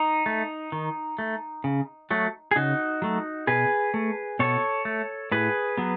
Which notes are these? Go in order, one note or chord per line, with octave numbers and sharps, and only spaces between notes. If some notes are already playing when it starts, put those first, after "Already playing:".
Already playing: D#4
A3
D#3
A3
C#3
F#3 A3
G#4
C#3 D#4 F#4
F#3 A3
B2 G#4 B4
A3
B2 A4 C#5
A3
A2 G#4 B4
F#3 B3